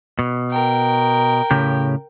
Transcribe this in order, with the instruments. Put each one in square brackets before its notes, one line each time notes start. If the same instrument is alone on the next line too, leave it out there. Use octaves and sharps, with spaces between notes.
[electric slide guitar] B2
[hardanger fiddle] A#4 G5
[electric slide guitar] A2 C#3 G4